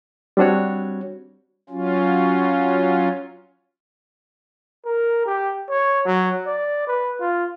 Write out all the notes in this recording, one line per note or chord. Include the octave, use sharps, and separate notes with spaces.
G3 C4 D4 F#4 C#5
F#3 C#4 F4
A#4
G4
C#5
F#3
D5
B4
F4